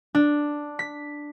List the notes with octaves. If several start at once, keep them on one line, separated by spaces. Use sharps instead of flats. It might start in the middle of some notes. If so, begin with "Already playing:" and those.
D4
B6